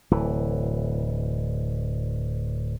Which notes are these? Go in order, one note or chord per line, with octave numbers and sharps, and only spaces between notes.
D1 E3